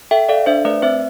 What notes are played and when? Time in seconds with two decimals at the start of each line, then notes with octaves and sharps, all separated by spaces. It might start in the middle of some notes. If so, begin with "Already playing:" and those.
0.11 A4 E5 G5
0.29 A4 D5 F5
0.46 D4 C5 E5
0.65 A3 B4 D5
0.82 C4 C5 E5